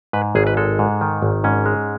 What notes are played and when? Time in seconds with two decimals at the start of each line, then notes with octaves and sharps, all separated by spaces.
0.13 G#2 B4
0.35 G#1 G#4
0.47 B4
0.57 G#3 A4
0.79 G#2
1.01 D#3
1.22 G#1
1.44 G#2 C#4
1.66 G#3